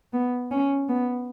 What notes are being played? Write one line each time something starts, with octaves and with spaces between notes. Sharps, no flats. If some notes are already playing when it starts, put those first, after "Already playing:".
B3
C#4
B3